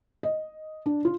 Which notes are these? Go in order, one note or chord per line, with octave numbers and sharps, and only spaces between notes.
D#5
D4
F4